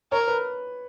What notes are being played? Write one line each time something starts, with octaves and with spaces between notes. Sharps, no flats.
A#4 C#5
B4